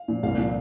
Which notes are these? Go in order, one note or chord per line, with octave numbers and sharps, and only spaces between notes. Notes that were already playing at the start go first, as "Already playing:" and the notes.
Already playing: F5
A#2 F3
C2 F5
A#2 F3